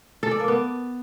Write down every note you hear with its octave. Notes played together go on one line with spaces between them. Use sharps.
A4
D5
A#3
B3